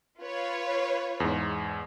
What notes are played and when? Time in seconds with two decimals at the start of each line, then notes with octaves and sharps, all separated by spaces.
0.23 F4 B4 C#5
1.20 E2 G#2